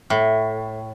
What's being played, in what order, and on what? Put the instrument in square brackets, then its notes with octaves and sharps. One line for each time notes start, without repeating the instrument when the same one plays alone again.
[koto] A2